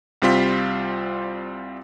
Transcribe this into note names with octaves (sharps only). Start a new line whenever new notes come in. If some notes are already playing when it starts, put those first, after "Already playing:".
C2 G3 C4 F4 B6